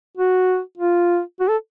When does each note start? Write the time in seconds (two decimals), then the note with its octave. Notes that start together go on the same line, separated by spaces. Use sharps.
0.17 F#4
0.78 F4
1.40 F#4
1.49 A4